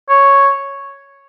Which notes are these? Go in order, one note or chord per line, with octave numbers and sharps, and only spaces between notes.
C#5